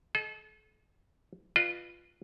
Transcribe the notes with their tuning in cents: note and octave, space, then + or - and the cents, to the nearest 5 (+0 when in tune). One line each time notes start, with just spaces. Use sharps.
A4 -40 D#5 +0
F4 +0 B4 +0 D#5 -40